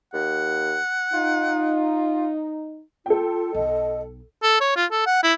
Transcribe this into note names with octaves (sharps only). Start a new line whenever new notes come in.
D#2 F#5
D#4 F4
F4 A4 G5
B1 D#4 D#5
A4
C#5
F4
A4
F#5
E4